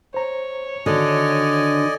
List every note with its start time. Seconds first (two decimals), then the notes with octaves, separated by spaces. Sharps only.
0.14 C5 C#5 A#5
0.86 D3 D#3 F#4 D5 D#5 G#5